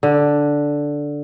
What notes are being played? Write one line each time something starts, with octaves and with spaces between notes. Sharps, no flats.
D3